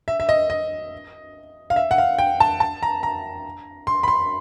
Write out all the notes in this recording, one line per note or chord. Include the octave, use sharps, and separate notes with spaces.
E5
E5
D#5
D#5
F5
E5
F#5
F5
G5
A5
A5
A#5
A#5
C6
B5
C6